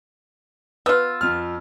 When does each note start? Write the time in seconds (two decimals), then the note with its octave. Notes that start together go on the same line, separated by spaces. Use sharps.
0.86 B3 F4 E6
1.21 F2 F6